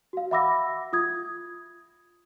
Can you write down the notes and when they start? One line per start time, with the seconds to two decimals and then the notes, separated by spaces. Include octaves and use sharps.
0.13 F#4 F5
0.31 E5 F#5 B5 D6 E6 A#6
0.93 F4 D#6 G#6